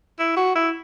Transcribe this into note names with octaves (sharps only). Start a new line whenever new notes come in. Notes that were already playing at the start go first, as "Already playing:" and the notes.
E4
F#4
E4